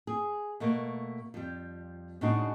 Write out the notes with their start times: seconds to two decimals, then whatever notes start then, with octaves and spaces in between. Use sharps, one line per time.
0.07 G#4
0.60 B2 A3 A#3
1.34 F2 G3
2.21 A2 C#3 G#3 D4 D#4 F#4